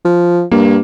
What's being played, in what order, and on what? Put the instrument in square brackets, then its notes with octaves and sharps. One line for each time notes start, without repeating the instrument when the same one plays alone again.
[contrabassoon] F3
[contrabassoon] G2 [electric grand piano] A#3